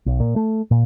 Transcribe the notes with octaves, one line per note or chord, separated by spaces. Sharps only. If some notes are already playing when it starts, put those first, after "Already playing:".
B1
A#2
A3
A#2